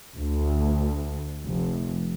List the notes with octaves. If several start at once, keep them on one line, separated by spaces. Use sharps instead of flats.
D2
F1